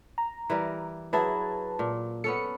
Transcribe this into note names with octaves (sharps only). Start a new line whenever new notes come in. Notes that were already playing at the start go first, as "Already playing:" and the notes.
A#5
E3 G3 A#4
F#3 E4 G#4 B4 A5
A#2
B3 C#4 A4 C#7